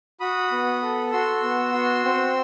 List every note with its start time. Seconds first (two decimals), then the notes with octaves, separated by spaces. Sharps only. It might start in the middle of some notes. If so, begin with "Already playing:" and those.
0.20 F#4 B5 D#6
0.52 B3
0.82 A4
1.12 F#4 C6 E6
1.43 B3
1.74 F#4
2.05 C4